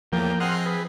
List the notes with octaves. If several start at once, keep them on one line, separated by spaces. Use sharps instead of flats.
E2 A2 F3 A#3 G5
C4 G#4 D#5 F#5 C6 F6
C4 G#4 B4